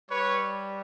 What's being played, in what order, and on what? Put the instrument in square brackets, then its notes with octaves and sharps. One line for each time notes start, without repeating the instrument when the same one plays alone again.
[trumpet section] G3 B4 C#5